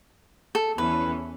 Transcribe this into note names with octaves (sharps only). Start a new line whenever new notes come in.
A4
E2 E3 C#4 B4